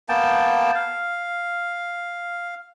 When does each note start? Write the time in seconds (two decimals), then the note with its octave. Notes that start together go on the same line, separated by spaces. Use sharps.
0.09 A#3 B3 G5 A5
0.75 F5